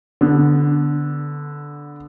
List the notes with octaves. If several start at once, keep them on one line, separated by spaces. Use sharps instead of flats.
D3 B3